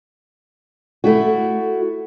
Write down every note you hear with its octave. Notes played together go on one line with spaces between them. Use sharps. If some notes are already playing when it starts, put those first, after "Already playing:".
A3 E4 F#4